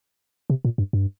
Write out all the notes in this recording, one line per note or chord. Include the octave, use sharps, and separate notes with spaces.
C3
A#2
G2
G2